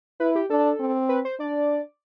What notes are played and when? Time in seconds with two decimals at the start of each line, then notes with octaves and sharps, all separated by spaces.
0.20 E4 B4
0.35 G4
0.50 D4 A4
0.80 C4
1.09 B4
1.25 C5
1.40 D4 D5